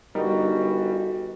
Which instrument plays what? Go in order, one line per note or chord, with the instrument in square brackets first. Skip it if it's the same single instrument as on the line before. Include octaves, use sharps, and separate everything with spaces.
[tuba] G1 [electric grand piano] G3 [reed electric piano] D#4 A#4 D#5 [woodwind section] F#4